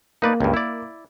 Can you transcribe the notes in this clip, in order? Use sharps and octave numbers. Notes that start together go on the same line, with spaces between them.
A#3 D#4 B4 D5
C#2 G2
E4 D5